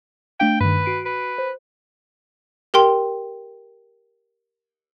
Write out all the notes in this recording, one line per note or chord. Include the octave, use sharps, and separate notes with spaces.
A3 D4 F5 G5
G2 D#3 B4
F#4 C7 D7
B4
C5
G4 A#4 G5 C6